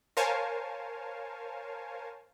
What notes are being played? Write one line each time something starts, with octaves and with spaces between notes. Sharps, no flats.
A#4 C5 C#5 F5 G#5 A5